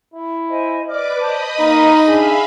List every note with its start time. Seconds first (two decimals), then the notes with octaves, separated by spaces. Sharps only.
0.14 E4
0.49 C5 D#5 G#5
0.88 B4 D5 D#5 D6 F6
1.20 C5 D#5 A5 B5 D#6 G6
1.59 A#3 D#4 A#4 A#5
2.07 D4 G#4 E5 F5 B5